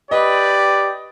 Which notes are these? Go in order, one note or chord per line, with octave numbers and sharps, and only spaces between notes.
G4 B4 D5 D#5